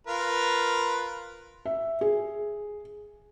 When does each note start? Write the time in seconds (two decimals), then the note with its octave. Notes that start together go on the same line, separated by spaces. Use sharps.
0.07 F4 A#4 B4
1.65 E5
2.01 G#4